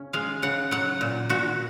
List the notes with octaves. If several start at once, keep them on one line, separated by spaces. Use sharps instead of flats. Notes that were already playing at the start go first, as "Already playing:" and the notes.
Already playing: C#3 C#4
G#3 F5
C#3 F#5
F#3 F#5
A#2
A#2 F#4